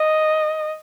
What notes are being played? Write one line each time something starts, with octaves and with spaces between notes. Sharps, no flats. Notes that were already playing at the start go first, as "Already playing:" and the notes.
Already playing: D#5